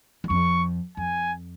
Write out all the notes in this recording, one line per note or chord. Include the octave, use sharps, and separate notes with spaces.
E2
F2 C#6
F2 G#5